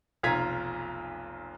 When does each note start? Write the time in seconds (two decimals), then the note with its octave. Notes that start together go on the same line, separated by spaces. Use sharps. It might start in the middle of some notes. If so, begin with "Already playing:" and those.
0.23 F1 B1 F4 A#5 G#6 B6